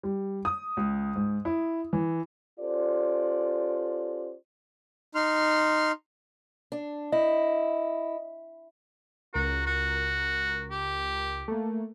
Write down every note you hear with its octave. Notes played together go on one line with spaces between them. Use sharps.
G3
D#6
C#2
G#2
E4
E3
C#4 F4 G4 A4 C5 D5
D#4 C6 F6
D4
E4 D#5
C#2 F#4 A#4
F#4
G4
A3 A#3